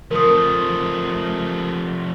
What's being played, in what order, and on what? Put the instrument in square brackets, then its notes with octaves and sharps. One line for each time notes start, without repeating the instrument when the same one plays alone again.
[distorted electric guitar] F3 A3 [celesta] A#4 D#6